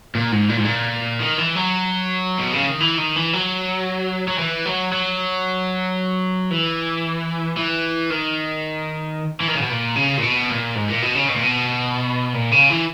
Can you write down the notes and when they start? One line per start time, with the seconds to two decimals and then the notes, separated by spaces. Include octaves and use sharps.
0.15 A#2
0.32 G#2
0.50 A#2
0.57 G#2
0.65 A#2
1.21 D#3
1.39 E3
1.56 F#3
2.39 B2
2.53 C#3
2.67 D#3
2.80 E3
2.98 D#3
3.16 E3
3.33 F#3
4.28 F#3
4.39 E3
4.66 F#3
4.92 F#3
6.51 E3
7.57 E3
8.10 D#3
9.40 E3
9.48 D#3
9.55 C#3
9.62 B2
9.70 A#2
9.96 C#3
10.17 A#2
10.22 B2
10.49 A#2
10.75 G#2
10.89 A#2
11.02 B2
11.15 C#3
11.29 B2
11.36 A#2
11.43 B2
12.34 A#2
12.52 C#3
12.70 E3